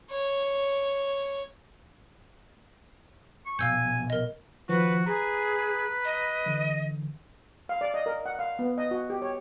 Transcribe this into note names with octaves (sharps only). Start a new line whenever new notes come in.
C#5
C#6
A#1 B2 F5 G#5 E6 G6
A#4 D#5
D#3 F3 F#4 B4
G#4 B4 A#5
D#5
D3 E3
F5
D5
D#5
A#4
F#5
F5
B3
D#5
F#4
G4
C#5